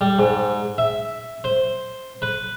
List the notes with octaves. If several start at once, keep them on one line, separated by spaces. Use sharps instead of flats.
G3
G#2
E5
C5
B4